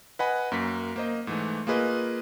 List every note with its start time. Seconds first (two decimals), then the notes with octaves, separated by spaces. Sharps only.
0.19 B4 D#5 F#5 G#5 B5
0.52 F#2 A#3 F#4 B6
0.96 A#3 C5 D#5
1.27 G#2 E3 A3
1.67 A#3 F4 G#4 B4 D#5